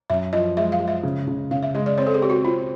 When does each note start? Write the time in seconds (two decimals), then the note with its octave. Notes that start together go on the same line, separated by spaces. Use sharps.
0.10 F#2 E5
0.33 F3 D#5
0.57 G#3 E5
0.72 F5
0.80 G#3
0.88 E5
1.03 C#3
1.28 C#3
1.51 C#3 F5
1.63 E5
1.74 G#3 D#5
1.86 D5
1.98 C4 C#5
2.07 A4
2.14 G#4
2.22 C4 G4
2.30 F#4
2.45 C4 F4